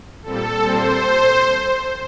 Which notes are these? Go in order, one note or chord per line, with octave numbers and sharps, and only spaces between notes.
A#2 G3 C4 A4
A#2 G3 C4 C5